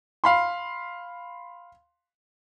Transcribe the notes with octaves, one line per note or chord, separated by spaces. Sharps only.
F5 B5 C6